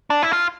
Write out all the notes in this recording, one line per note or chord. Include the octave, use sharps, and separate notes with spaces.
D4
E4
F4